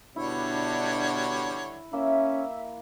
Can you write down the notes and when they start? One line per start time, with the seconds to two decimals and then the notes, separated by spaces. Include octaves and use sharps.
0.16 B2 D3 G3 D4 E4 C#5
1.93 A#3 C#4 E5